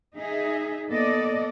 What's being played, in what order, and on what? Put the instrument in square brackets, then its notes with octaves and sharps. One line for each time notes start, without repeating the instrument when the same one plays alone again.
[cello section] D#4 G#4 E5
A#3 B3 A4 D5 D#5